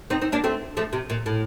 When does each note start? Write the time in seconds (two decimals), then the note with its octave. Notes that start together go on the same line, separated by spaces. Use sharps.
0.10 C4 D#4
0.22 C4 D#4
0.32 A#3 D4
0.44 A3 C4
0.77 F3 A3
0.93 C3
1.10 A#2
1.26 A2